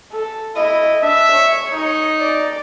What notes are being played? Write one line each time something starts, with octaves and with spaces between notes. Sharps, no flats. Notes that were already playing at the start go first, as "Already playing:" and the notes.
A4
E4 D#5
D4 E5
C#5
D#4
D5